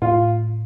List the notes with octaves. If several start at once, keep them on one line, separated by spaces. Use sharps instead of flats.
A2 F4